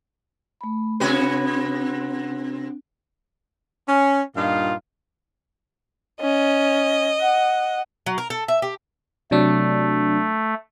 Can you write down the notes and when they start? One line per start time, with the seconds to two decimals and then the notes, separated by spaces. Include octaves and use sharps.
0.61 A3 B5
1.00 C3 C4 D4 F#4 B4
3.88 C#4
4.36 G2 A#2 D#4 F4 F5
6.21 C#4 D#5
7.21 F#5
8.06 F#3
8.18 A#4
8.30 A4
8.48 E5
8.62 G4
9.31 C3 F#3 A3 D4